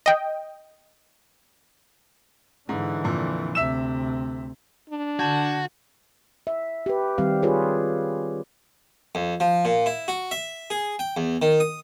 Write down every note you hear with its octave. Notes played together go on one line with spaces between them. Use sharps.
D#5 G5
G#2 D3 E3
F2 A#2
D2 C3 E5 E6 E7
D4
D3 F#4 A5 G6 G#6
E5
G4 B4
D#3 G3 C4 G4 F5
F4 G4 G#4 B4 C#5
F2
F3
A#2
E4
F#4
E5
G#4
G5
E2
D#3
D#6